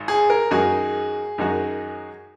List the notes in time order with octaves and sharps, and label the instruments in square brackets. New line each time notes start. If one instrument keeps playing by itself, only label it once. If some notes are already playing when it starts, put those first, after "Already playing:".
Already playing: [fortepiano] G#1 G#2
[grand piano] G#4
A#4
[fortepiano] F#2 D#3 G#3 D#4 F#4 [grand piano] G#4
[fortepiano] F#2 D#3 G#3 D#4 F#4